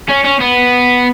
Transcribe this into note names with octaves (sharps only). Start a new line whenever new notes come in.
C#4
C#4
B3